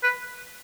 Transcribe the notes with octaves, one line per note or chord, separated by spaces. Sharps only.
B4